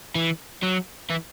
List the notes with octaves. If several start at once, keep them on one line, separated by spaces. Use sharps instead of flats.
E3
F#3
E3